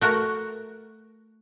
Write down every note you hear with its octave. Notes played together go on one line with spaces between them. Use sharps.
A3 F#4 A#4